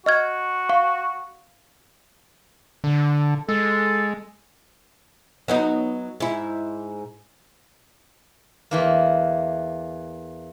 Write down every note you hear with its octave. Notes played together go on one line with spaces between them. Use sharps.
F#4 D#5 F6 G#6
F5 C#6
D3
G#3 A4
F#3 B3 D#4
G#2 E4
E2 E3 A#3